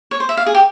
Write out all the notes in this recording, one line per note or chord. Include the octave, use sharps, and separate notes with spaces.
C#5
C5
E5
F5
G#4
G4